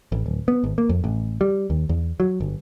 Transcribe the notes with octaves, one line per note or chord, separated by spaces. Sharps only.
A1
D1
B3
G#1
A#3
F2
A1
G3
D#2
E2
F#3
G1